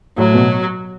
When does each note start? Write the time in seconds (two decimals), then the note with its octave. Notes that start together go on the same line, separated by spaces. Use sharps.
0.18 A2 F#3
0.34 B2